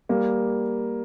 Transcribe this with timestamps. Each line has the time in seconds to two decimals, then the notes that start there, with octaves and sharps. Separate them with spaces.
0.09 G3 A#3